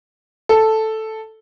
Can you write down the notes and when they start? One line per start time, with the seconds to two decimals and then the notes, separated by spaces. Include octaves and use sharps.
0.49 A4